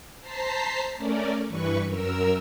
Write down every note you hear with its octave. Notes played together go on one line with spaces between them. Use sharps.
C5 A5 A#5 B6 C7
A3 C#4 A#4 D5
G2 E3 B4 C#6
F#2 A#4 E6